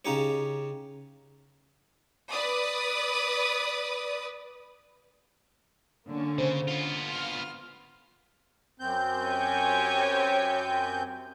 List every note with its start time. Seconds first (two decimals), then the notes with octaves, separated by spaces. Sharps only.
0.05 C#3 D#4 G4 C#5
2.31 B4 D5 D#6
6.07 D3 A#3 C#4
6.38 C#3 C5
6.68 B3 F4
7.04 C6 F6
8.80 F#2 C4 G6
9.26 G4 C#5 G#5